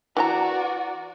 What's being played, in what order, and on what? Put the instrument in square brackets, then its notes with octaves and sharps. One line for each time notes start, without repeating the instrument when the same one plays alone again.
[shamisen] E3 G4 A#5 [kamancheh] F#4 D5